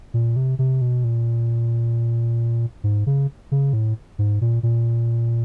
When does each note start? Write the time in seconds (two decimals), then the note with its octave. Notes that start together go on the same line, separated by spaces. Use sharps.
0.14 A#2
0.36 C3
0.59 C3
0.81 B2
1.04 A#2
2.84 G#2
3.07 C#3
3.52 C#3
3.73 A2
4.19 G#2
4.41 A#2
4.63 A#2